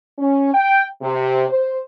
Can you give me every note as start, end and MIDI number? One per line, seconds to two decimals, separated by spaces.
0.19 0.52 61
0.54 0.84 79
1.02 1.44 48
1.49 1.77 72